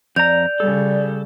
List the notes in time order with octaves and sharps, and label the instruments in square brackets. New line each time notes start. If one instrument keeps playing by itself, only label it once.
[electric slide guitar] F2 A#5 [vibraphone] D5 [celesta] G6 F7
[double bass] C#3 G3 [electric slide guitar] A4